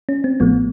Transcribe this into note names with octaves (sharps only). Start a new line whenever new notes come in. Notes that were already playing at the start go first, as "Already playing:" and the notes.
C#4
C4
A1 A2 F3 A3 B3